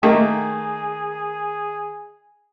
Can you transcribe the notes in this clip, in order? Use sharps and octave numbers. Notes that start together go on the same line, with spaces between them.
D#3 A3 A#3 G#4